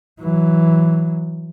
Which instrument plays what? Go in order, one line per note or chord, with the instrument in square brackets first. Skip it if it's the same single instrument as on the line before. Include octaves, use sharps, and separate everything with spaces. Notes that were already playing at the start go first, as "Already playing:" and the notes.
[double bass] E3 F#3